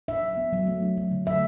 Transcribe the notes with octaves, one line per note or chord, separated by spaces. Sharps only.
D4 E5
F#3
B3
F#3
A3
D4
F#3
D3
A3 E5